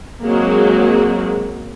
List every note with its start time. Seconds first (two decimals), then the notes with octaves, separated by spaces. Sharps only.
0.25 F#3 G#3 A#3 C4 F#4